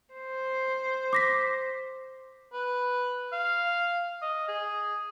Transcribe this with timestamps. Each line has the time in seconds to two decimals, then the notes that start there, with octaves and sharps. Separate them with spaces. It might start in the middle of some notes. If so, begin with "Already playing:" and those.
0.14 C5
1.13 D6 A#6 B6
2.53 B4
3.33 F5
4.22 D#5
4.48 G#4